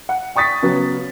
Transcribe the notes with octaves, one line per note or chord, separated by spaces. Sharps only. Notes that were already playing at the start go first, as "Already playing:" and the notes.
F#5
G5 C#6 D#6 A6 B6
C#3 F#3 B3